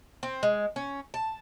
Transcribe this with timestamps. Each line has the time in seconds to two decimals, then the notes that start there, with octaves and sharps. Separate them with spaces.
0.23 C4
0.43 G#3
0.76 C#4
1.14 A5